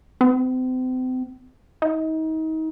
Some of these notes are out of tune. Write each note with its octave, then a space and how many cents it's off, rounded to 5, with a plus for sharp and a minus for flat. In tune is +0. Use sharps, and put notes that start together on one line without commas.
C4 -35
D#4 +35